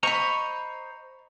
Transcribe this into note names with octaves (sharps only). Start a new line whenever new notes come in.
C5 D#5 A#5 B5 C#6